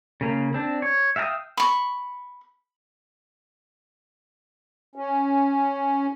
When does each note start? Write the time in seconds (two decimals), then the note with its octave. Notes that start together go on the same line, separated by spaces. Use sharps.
0.21 C#3 A#3
0.54 C4 D4
0.82 C#5
1.16 E5 F5 G5 A5 D#6
1.57 B5 C#6
4.95 C#4